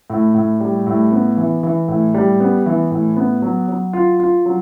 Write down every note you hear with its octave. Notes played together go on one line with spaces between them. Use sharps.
A2
A2
G3
A2
B3
E3
E3
A2
G3
B3
E3
A2
B3
F#3
F#3
F4
F4
F#3